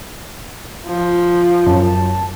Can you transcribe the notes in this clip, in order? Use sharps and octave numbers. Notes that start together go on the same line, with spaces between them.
F3
F#2 A5